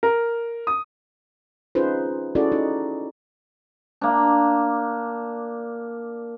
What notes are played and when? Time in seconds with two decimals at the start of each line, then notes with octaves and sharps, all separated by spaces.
0.03 A#4
0.67 D#6
1.75 C#4 D#4 F4 G#4 B4 C5
2.35 C#4 E4 F#4 G#4 A4 D5
2.52 D#4
4.01 A#3 D4